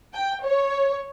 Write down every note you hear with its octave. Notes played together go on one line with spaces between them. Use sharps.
G5
C#5